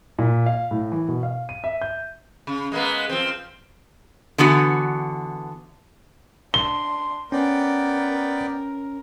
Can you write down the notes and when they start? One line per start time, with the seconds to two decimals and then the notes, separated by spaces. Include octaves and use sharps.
0.19 A#2
0.46 F5
0.71 A2
0.92 E3
1.09 B2
1.23 F5
1.49 D#7
1.64 E5
1.82 G6
2.47 C#3
2.72 G#3 A#3 B3
3.09 F3 C4
4.38 D3 E3 B3 F#4
6.54 D4 C6 G7
7.32 B3 C#4 A#4 D5 G5